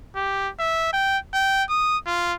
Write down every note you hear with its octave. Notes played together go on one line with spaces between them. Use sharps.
G4
E5
G5
G5
D#6
F4